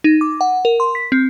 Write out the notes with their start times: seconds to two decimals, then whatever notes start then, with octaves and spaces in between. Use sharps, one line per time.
0.04 D#4
0.21 D6
0.41 F#5
0.65 A#4
0.80 C6
0.95 B6
1.12 C4